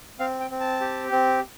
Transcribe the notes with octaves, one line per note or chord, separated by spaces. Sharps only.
C4 F5
G5
C4
A5
G4
C4